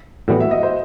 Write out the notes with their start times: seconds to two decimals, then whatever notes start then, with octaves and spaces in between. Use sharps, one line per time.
0.28 A2 E3 G3 B3 F#4
0.40 E5
0.51 D#5
0.63 C5